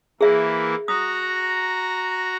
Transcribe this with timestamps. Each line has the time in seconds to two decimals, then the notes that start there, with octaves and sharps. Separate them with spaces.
0.21 E3 A#3 E4 G#4 E5
0.88 F#4 A#5 D#6